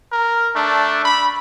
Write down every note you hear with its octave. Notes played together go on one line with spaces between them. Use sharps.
A#4
A3 D4
B5